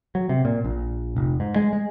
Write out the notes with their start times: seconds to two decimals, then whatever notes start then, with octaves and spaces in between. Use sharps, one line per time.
0.15 F#3
0.29 C3
0.45 A#2
0.64 A#1
1.16 F1
1.40 G#2
1.56 G#3
1.73 G#3